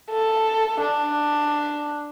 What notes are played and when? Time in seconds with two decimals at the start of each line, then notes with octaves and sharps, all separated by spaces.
0.11 A4
0.81 D4